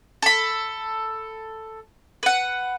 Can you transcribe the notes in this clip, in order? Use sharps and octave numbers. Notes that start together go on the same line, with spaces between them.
A4 B5
B4 F#5